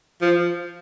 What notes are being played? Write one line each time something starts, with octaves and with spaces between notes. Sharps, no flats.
F3